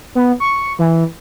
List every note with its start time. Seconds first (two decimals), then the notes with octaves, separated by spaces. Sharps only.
0.15 B3
0.40 C#6
0.79 E3